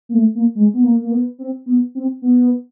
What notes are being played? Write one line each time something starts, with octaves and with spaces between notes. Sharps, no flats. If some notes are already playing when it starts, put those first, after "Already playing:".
A#3
A3
A#3
G#3
B3
A#3
A#3
B3
C4
B3
C4
B3